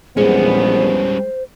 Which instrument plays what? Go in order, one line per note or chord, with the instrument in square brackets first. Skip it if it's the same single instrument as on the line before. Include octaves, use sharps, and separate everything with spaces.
[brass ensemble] A#1 E2 B3 [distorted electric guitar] G3 C#4 [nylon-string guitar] G#3 [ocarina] C5